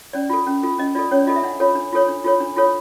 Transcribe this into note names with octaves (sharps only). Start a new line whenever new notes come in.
C#4 D5
F4 A4
C#4
F4 A4
C#4 D#5
F4 A4 D5
C#4 C#5
D5
F4 A4 D#5
E5
D4 F#5
F4 A4 C#5
D4
F4 A4 C#5
D4
F4 A4 C#5
D4
F4 A4 C#5